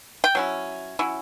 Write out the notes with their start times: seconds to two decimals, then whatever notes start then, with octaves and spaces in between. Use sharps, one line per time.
0.24 G5
0.35 F#3 C#4 E4
0.99 F#3 C#4 E4